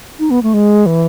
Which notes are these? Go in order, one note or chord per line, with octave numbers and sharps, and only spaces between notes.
D#4
B3
A3
G#3
E3